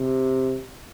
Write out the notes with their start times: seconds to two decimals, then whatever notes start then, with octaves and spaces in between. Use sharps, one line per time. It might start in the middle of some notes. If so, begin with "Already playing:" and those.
Already playing: C3